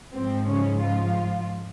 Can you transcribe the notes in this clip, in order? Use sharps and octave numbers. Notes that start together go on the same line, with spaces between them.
G#2 F3 C4
C#3 C#4
F3 F4